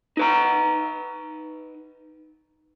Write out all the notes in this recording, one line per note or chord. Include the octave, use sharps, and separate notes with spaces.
D#4 B4 A#5